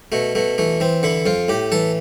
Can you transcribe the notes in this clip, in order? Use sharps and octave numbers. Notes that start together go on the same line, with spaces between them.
B2 A3
B2 A3
E3 A3
E3 C4
D3 E4
F2 F4
A2 G4
E3 A4